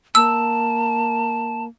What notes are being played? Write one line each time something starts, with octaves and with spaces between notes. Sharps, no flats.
A#3 A5 E6